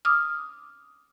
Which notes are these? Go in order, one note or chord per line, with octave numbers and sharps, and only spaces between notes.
D6 D#6 F6